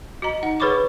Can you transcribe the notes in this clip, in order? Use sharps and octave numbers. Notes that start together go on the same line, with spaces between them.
F#4 D#5 A#5
D#4 F#5
G#4 B4 C#5 B5 C#6 D6